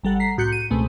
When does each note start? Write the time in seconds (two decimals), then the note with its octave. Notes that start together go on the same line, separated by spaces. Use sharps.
0.03 G#1 G3 A4 F#5
0.19 A#5 B6 C7
0.37 C2 A2 F#4 F#6 G6 C#7
0.52 D#7
0.71 C#2 B2 G#3 A3 C4